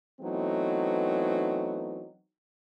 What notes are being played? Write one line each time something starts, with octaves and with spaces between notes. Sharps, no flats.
E3 F#3 A3 B3 C4 D#4